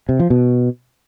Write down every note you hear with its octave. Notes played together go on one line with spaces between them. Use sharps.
C3
F3
B2